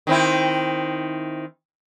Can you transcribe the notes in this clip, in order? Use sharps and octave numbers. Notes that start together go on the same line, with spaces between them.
D#3 C4 E4